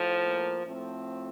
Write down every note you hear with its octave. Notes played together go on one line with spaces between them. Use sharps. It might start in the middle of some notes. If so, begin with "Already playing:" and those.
Already playing: A2 F3
A#3
A2 F3 A3 C4